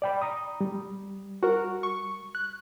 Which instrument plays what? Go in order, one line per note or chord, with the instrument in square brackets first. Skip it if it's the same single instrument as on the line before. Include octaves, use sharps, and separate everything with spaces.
[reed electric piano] D5 G5 B5
A#5 D#6
G3
[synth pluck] F#4 A#4
C#6
F#6